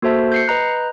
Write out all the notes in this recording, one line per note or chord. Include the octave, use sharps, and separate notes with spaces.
A#3 F#4 A4 C5 E5 A5
G6 C7 C#7
B4 D#5 A#5 F#6 G6